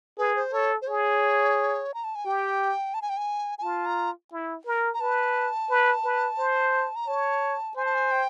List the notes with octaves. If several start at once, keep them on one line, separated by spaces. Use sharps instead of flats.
G#4 B4
C5
A4 C#5
C5
G#4 C#5
A#5
A5
G#5
G4 G5
A5
G#5
G5
G#5
G#5
F4 A5
A#5
E4
A#4
A#5
B4 A5
B4
B4
C5
A#5
C#5 A5
C5 G#5
A5
G#5
G5